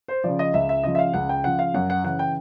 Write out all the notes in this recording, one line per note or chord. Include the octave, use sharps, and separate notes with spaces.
C5
C#3 F3 D5
D#5
C#2 E5
E5
C#3 F3 D#5
E5
F5
C#2 F#5
G5
C#3 F3 F#5
F5
F#2 F#5
F#5
C#3 E3 F#5
G5